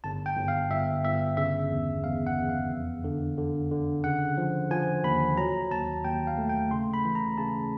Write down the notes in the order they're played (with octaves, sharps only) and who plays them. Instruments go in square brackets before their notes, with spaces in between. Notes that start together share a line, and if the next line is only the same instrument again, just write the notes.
[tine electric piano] G1 A5
G5
G1
F5
G1 E5
G1 E5
C#3 E5
E2
E2 F5
F#5
E2
F5
F2
D3
D3
D3
C#3 F#5
F3
F3 G#5
D#2 B5
F#3 A#5
D#2 A5
D#2 G5
F5
A3
G5
C#3 C6
B5
E3
A#5
C#3 A5